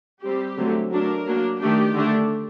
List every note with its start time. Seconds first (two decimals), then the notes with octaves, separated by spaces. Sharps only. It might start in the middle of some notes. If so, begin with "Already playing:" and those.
0.23 G3 C4 G4
0.57 D3 F#3 A3 C4
0.91 F#3 A3 D4 A#4
1.26 F#3 A#3 D4
1.61 D#3 A3 D4 G4
1.95 D3 A3 D4